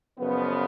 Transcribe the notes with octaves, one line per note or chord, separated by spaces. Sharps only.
F#1 F#2 C#3 F3 B3